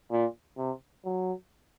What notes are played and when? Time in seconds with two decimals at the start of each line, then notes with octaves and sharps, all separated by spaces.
0.11 A#2
0.58 C3
1.05 F#3